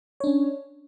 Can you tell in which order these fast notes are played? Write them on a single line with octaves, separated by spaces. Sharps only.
C#5 D4 C#4